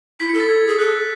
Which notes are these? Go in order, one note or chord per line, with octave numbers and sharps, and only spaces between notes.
E4 B6
C#7
A4
A6
G#6
G#4
A4 F#6